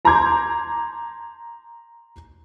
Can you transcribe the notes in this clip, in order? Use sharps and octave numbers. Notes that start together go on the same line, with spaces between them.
A5 A#5 C6 D6 G6 G#6